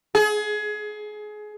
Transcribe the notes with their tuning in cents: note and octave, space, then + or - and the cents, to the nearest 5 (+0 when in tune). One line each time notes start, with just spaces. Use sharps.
G#4 +25